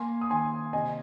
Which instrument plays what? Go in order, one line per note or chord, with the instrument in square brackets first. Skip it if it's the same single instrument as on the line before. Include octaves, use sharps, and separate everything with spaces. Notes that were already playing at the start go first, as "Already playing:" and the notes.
Already playing: [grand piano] A#3 G#5 C6
D#6
D#3 G#5 C6
C3 D#5 G#5